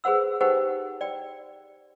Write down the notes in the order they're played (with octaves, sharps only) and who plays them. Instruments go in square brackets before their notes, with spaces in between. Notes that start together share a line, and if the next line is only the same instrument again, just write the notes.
[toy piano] G#4 B4 C5 F#5 E6
D#4 G4 B4 C5 F#5 G5
D5 G5